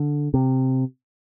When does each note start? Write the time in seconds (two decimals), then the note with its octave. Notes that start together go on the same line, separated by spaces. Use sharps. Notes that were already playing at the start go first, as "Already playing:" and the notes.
Already playing: D3
0.34 C3